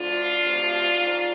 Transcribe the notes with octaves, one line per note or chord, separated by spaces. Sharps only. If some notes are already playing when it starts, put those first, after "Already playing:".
Already playing: D2 D3 F3 D4 F4
D2 C3 F3
G#2 F3